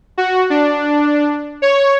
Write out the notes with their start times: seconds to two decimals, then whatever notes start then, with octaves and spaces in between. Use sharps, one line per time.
0.18 F#4
0.50 D4
1.62 C#5